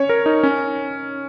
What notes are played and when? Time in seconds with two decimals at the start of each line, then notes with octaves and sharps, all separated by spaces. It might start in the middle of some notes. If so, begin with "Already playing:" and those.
Already playing: C#4 C#5
0.09 A#4
0.26 D#4
0.43 C#4